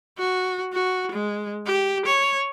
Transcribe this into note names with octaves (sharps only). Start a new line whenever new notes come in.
F#4
F#4
G#3
G4
C#5